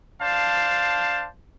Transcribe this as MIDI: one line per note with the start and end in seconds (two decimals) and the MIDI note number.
0.21 1.27 62
0.21 1.27 72
0.21 1.27 77
0.21 1.27 81